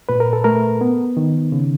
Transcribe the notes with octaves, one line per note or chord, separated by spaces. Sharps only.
A#2 B4
A#4
A4
A3 A#4
B3
D#3
C#3